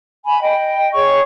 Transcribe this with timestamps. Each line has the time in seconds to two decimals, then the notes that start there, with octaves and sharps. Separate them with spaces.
0.24 G#5 B5
0.41 D#5 G5
0.93 G#4 C#5 C#6